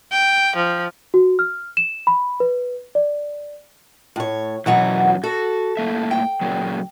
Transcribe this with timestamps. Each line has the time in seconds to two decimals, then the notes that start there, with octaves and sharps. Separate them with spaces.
0.12 G5
0.57 F3
1.14 F#4
1.39 F6
1.77 E7
2.07 B5
2.40 B4
2.95 D5
4.16 A2 C#5
4.66 F#2 B2 E3 F#3 F#4
5.24 F#4 A4
5.77 A2 A#3 E5
6.11 G5
6.41 A#2 C#3 F#3